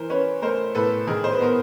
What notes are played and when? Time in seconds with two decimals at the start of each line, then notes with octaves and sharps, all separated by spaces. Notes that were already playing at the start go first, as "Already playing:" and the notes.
Already playing: E3 A#4 C5
0.10 C#4 B4 C#5
0.42 A3 A#4 C5
0.75 A2 A4 B4
1.07 D#3 G#4 A#4
1.24 C5
1.33 B4
1.40 B3 A#4